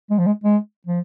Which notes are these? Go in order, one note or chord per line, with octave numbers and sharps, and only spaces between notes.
G#3
F3
G#3
G#3
F3